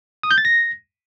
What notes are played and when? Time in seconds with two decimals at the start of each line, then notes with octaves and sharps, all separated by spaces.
0.23 D#6
0.31 G6
0.38 A6
0.45 A#6